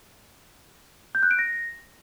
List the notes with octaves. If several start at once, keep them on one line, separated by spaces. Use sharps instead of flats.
G6
F#6
D7
A#6